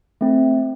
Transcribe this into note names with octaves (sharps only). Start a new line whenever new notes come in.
A3 C4